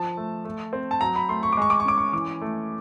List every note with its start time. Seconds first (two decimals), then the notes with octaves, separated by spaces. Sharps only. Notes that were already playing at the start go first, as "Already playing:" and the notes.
Already playing: F3 A5
0.17 A3
0.45 A3
0.73 C4
0.91 A5
1.01 F#3 A#5
1.16 B5
1.29 A3 C6
1.43 C#6
1.53 D6
1.57 G#3 C#6
1.70 D6
1.80 C#6
1.85 C#4 D6
1.98 C#6
2.13 E3 D6
2.41 A3